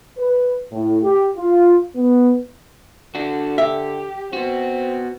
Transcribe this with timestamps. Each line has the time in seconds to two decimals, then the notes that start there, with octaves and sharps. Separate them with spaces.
0.18 B4
0.72 A2
1.03 G4
1.37 F4
1.95 B3
3.15 D3 D4 F#4
3.58 G4 E5
4.33 B3 C4 F#4